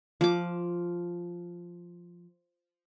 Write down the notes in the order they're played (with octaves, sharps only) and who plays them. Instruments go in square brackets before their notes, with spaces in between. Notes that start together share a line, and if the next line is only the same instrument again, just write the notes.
[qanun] F3 D6